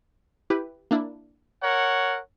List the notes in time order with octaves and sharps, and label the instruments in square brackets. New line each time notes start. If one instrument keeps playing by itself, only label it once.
[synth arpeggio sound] E4 G4 B4
A#3 D4 E4
[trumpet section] A#4 C#5 F#5